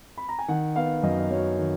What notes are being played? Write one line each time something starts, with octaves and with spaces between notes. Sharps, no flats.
B5
A#5
G#5
D#3 F#5
B3 F5
F#2 D#5
D#5
F#3 C#5
D#3